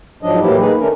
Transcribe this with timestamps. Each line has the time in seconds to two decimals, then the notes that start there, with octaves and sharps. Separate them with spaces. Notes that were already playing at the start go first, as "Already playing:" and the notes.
0.23 G#2 F3 F#3 D4 D#5
0.41 A2 E3 F#3 A#3 E4 G4
0.60 A#3 D#4 G#4 B4
0.79 D#3 A3 C#4 D4 A#4